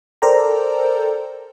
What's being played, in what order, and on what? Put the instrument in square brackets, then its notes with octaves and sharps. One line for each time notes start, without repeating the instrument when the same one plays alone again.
[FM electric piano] A4 A#4 C5 D5 G5 A#5